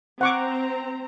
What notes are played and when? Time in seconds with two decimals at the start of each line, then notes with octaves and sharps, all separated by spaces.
0.21 C4 F#5 A#5 C#6 D6